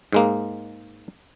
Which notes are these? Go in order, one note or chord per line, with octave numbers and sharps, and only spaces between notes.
G#2 G#3 A#3